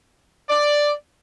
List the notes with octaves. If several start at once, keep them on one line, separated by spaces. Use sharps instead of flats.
D5